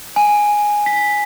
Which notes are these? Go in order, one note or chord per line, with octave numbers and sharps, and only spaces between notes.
G#5
B6